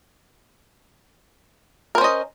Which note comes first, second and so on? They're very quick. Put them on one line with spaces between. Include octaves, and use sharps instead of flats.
A#4 C5 C#4 D#5